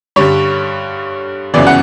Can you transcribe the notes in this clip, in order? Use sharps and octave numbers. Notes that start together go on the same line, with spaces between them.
G2 D3 G3 C#5
G1 F#2 C#3 E3 B3 D5
F#5